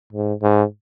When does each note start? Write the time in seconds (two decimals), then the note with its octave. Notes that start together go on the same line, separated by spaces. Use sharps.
0.13 G#2
0.42 G#2